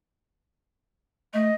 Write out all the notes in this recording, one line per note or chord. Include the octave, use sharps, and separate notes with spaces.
A3 D#5